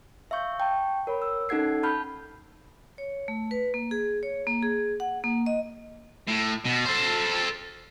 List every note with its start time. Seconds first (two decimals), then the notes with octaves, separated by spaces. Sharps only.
0.31 E5 F5 C#6 G6
0.60 G5 A5 C#6
1.07 A#4 C#5 B5
1.22 E6
1.49 C#4 D#4 A4 F#5 G#6 C7
1.83 A5 B5 F6 G6
2.98 C#5
3.28 A3
3.51 B4
3.74 A#3
3.91 G#4
4.23 C#5
4.47 A#3
4.63 G#4
5.00 F#5
5.24 A#3
5.46 D#5
6.28 A2
6.65 B2
6.85 A4 C5